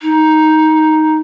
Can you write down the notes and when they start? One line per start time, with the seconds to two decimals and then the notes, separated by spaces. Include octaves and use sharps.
0.01 D#4